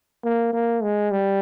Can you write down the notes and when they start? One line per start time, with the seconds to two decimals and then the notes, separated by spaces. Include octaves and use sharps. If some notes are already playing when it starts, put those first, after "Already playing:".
0.24 A#3
0.53 A#3
0.83 G#3
1.11 G3